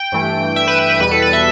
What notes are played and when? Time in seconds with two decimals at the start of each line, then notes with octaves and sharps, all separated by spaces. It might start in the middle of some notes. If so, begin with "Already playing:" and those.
Already playing: G5
0.12 G2 E3 A3
0.56 E5
0.68 B4
0.79 B4
0.89 B4
1.00 E2 B2 G3 B4
1.11 A4
1.22 B4
1.33 E5